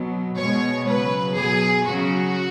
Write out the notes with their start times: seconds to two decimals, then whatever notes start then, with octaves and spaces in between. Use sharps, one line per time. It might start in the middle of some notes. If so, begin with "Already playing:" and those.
Already playing: B2 F#3
0.38 B2 G#3 C#5
0.87 C#3 F#3 B4
1.36 B2 F#3 G#4
1.86 C#3 F#3 F#4